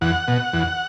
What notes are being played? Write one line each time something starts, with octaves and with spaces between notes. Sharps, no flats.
E2 F#5
B2
E2